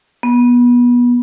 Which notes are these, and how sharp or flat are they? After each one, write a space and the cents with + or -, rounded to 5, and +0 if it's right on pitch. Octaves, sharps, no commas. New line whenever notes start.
B3 -25